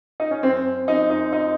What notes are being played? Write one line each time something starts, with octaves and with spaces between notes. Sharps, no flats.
D#4
C#4
F#2 C4
F#2 D#4
D#4
D#4